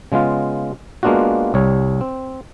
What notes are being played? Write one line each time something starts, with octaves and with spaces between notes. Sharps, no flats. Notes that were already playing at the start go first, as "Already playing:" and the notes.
C#3 G#3 B3 F4
G#3 A#3 B3 D4 F4 F#4
C2 G3 C#5
C4